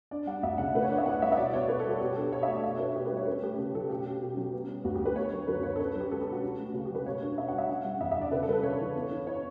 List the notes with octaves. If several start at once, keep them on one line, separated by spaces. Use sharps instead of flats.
D4 D5
G3 F#5
D2 E5
C#3 F#5
A2 B4
C#5
D4 D5
E5
A2 F#5
G3 E5
E5
B2 D5
B3 C#5
B2 B4
A4
G3 F#4
B2 G4
D4 A4
B2 C#5
E5
A3
D5
B2 E5
C#5
D4 B4
B2 G4
B4
G3
C#5
C#4 B4
A3 G4
C#3 G4
F#3 A4
B2 G4
C#4
B2
F#3
B3
G3
D2 F#4
G4
D3 B4
B3 C#5
F#3
F#2 B4
D3 C#5
A4
C#4 B4
F#3 G4
C#2 A4
G4
B2 F#4
C#4
A3
C#3 F#4
G4
F#3 B4
B2 C#5
D4
B2 E5
F#5
G3 E5
C#4 F#5
G3
E2 E5
E5
D3 D5
C#3 B4
A4
G3 B4
A4
C#3 C#5
E3
B3
E3
C#5